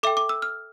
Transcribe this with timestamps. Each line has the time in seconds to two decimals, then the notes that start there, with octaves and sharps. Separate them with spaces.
0.03 A4 E5 G5 D6
0.17 D6
0.29 E6
0.42 F6